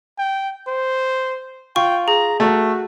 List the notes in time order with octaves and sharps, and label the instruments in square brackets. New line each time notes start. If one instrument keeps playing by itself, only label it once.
[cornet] G5
C5
[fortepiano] F4 [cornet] G5 [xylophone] C#6
[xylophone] G#4 [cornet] A#5
[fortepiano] A3 [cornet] F#4